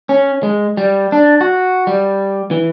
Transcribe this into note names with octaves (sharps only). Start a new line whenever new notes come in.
C#4
G#3
G3
D4
F#4
G3
E3